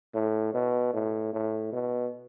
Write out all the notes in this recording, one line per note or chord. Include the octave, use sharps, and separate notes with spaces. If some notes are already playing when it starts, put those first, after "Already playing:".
A2
B2
A2
A2
B2